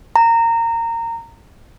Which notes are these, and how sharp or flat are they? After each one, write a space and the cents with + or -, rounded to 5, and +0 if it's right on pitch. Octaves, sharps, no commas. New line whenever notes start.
A#5 -20